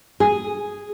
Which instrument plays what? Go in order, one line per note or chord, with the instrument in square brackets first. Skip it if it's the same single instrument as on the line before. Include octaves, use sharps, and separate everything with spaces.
[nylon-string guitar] G#4